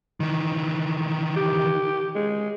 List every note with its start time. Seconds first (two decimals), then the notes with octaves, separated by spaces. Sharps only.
0.20 D#3 E3
1.36 G4
2.15 G#3